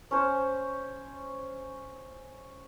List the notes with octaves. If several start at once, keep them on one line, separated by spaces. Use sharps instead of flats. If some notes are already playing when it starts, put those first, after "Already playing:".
C#4 C5